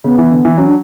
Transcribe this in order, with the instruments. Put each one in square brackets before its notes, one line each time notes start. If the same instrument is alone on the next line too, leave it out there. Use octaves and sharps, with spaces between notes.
[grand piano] C#3 [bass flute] B3
[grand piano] E3
D3
E3
[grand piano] F#3 [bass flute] C#4
[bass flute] D4